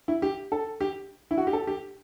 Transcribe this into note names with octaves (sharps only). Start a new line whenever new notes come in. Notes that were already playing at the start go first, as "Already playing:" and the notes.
E4
G4
A4
G4
E4
F#4
G4
A4
G4